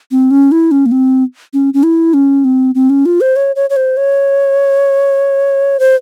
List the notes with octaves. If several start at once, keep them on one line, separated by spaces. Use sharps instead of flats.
C4
C#4
E4
C#4
A#3
C4
C#4
C#4
E4
C#4
C4
C4
C#4
F4
C5
C#5
C#5
C#5
C5
C#5
C5